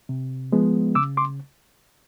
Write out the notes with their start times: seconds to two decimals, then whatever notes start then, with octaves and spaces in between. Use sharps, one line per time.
0.09 C3
0.52 F3 G#3 B3
0.95 C#3 D6 E6
1.17 C6 D6